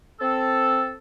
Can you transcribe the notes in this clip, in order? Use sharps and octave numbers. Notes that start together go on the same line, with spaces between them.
C4 A4